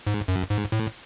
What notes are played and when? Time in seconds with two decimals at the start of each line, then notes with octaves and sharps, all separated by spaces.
0.07 G#2
0.28 F#2
0.50 G#2
0.72 A2